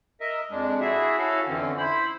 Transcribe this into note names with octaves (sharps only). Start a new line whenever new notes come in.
A#4 D#5 E5
F2 G#3 D4
E4 F#4 G#4 E5
C#4 E4 F#4 A4 F5
F2 D3 E3 C4 C#4
E4 C5 B5